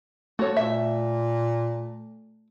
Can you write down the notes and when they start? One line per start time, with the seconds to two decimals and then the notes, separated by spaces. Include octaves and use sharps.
0.39 A3 F#4 C#5
0.57 A#2 E5